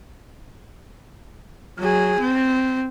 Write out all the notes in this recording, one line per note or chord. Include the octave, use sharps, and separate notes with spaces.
F#3 G#4
C4